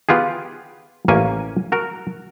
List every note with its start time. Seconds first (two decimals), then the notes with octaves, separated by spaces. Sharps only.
0.09 B3 F4 G4 G#4
1.08 A1 A#3 C#4 A#4 G#5
1.72 F#4 A#4